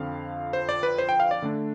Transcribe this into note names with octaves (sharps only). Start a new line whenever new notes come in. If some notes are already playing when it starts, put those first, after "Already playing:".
Already playing: F2 D3 F3 C4 F5
C5
D5
B4
C5
G5
F5
D5
D3 A3 D4